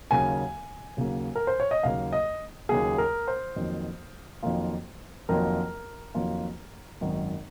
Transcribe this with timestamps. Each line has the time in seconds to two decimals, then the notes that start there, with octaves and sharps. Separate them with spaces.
0.11 D#2 C#3 F#3 A#3 G#5
0.97 D#2 C#3 F#3 A#3
1.35 A#4
1.47 C5
1.60 C#5
1.71 D#5
1.83 D#2 C#3 F#3 A#3 F5
2.13 D#5
2.69 D#2 C#3 F#3 A#3 G#4
2.98 A#4
3.28 C5
3.56 F2 D#3 F#3 A#3 F4
4.43 F2 D#3 F#3 A#3 F4
5.29 F2 D#3 F#3 A#3 F4 A#4
6.14 F2 D#3 F#3 A#3 F4
7.01 G#1 F#2 D#3